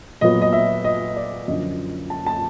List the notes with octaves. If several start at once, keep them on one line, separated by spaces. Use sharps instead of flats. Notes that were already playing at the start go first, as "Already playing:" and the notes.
A#2 F#3 B3 D#5
D#5
E5
D#5
D5
F#2 D3 F3 D#5
A5
A5